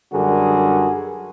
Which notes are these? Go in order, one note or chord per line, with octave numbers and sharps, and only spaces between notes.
F#2 D3 G3 F#4 G#4 A#4